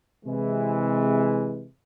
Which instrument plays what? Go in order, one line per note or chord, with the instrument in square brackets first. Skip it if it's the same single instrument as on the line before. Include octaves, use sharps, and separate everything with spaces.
[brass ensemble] C3 E3 G#3